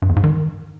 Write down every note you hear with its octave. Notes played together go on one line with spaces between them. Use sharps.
G2
E2
G#2
D#3